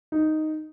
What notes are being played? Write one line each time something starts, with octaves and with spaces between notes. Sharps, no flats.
D#4